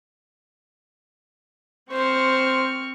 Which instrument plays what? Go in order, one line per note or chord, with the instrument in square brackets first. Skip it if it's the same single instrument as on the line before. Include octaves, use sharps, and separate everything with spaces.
[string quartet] C4 C#6 F6 [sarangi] C5